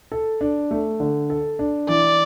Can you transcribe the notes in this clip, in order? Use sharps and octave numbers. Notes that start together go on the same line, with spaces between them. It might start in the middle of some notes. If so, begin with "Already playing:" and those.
A4
D4
A3
D3
A4
D4
E3 D5